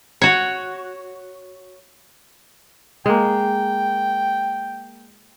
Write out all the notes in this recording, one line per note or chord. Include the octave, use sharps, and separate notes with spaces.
F#4 C#5
G#3 A#3 G5